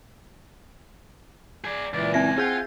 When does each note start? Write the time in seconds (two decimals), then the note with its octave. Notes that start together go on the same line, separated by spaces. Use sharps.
1.64 G#4 D5
1.94 C#2 A#2 E3 D5
2.14 C4 E5 G#5 A#6
2.38 C4 F4 G#4 F#5 G6